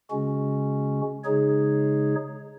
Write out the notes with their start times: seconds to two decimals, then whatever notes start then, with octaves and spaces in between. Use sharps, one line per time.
0.10 C#3 G#3 C#4 F#4
1.24 C#3 G#3 D#4 G#4 C#5